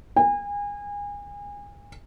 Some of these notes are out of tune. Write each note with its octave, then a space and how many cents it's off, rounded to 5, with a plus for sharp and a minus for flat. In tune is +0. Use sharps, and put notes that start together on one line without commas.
G#5 -30